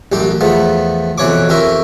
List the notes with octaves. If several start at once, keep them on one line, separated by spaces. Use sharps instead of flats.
A1 F#2 G4
E2 F3 A3 B3
F2 B2 E3 C#5 C#6 D6
F2 G4 A#4 E5 C#6